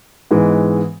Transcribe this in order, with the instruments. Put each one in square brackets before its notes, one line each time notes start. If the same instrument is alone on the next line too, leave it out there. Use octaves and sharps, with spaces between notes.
[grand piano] G#2 E3 G#3 B3